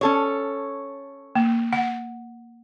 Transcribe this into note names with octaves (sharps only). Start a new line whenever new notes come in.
C#4 A4 C#5
A#3
F#5